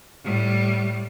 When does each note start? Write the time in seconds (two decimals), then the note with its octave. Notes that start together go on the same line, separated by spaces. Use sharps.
0.25 A2 G3